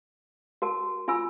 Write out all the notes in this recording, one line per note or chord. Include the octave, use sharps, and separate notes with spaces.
F#4 A#4 A5
F4 G#5 B5 E6